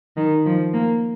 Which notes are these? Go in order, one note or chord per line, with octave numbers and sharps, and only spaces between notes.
D#3
F3
A#3